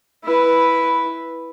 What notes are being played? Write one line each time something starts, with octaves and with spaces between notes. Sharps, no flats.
E4 B4